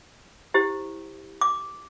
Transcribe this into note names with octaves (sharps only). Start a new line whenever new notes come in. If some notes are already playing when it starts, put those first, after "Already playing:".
E4 G4 C5
D6